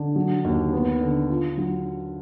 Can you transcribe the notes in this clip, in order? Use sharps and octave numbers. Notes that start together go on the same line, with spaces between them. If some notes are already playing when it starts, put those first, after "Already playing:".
Already playing: D3
F#3
D#2
B3
D3
F4
F#3